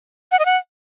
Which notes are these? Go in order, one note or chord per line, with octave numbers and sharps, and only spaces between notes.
F#5
D#5
F#5